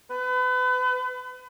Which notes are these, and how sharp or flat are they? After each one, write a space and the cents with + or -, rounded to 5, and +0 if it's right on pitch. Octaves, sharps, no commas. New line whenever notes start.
B4 +35